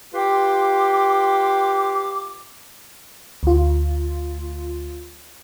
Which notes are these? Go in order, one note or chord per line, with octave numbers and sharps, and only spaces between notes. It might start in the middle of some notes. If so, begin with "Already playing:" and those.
F4 G4 B4 G5 C6 D6
D2 F4